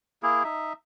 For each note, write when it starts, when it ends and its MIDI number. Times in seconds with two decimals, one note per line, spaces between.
0.23 0.43 58
0.23 0.43 64
0.23 0.43 68
0.44 0.73 63
0.44 0.73 76